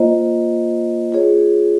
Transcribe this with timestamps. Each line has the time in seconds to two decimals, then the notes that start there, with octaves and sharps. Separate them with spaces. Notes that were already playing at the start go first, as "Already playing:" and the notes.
Already playing: A#3 F4 C5 D#5
1.12 F4 G#4 C#5